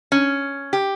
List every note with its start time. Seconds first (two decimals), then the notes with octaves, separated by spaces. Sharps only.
0.12 C#4
0.73 G4